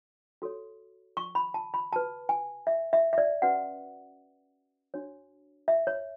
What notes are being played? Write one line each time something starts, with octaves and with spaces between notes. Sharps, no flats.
F#4 A4 C#5
C#6
B5
A5
B5
F#4 B4 A5
G#5
E5
E5
E5
D5
C#4 F#4 B4 F#5
D4 F#4 C#5
E5
C#5